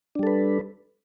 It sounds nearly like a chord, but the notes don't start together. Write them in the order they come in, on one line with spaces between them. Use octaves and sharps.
D4 G3 A4 B4